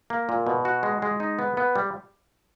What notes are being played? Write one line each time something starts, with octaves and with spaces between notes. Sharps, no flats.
A#3
A#2
B2
F#4
G#3
G#3
D#4
B3
B3
G3